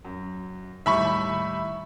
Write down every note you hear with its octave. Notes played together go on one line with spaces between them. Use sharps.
F#2
D#2 A2 G3 E5 B5 C#6